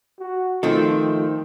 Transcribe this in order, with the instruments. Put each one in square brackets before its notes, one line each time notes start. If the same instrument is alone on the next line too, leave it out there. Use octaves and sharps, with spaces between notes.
[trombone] F#4
[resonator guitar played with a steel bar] D#3 C4 [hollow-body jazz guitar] F3 A3 A4 [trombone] F4